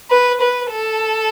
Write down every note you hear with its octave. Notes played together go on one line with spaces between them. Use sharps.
B4
B4
A4